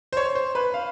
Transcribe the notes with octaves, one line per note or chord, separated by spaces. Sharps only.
C5
C#5
C5
B4
F5